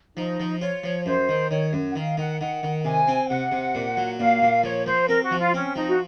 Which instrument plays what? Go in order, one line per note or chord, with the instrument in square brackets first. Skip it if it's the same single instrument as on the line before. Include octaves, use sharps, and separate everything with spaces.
[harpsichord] F3 [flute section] D#4
[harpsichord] F3
[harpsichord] F4 [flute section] C#5
[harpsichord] F3
[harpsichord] F#2 [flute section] C5
[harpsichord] D#3
[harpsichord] D#3 [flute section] C#5
[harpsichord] F#2
[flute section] F#5
[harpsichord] D#3 [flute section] F5
[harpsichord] D#3 [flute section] F#5
[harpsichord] D#3 [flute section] F#5
[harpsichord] D#3
[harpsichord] C3 [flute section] G#5
[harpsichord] C4
[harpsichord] C3 [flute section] F#5
[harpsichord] C3
A#2
F#3
[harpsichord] A#2 [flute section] F5
[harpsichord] A#2
[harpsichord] F3 [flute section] C#5
[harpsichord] F3 [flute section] C5
[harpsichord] C4 [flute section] A#4
[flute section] F#4
[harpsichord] F3
[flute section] F4
[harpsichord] C4 [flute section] C#4
[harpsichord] F3 [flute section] D#4
[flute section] F#4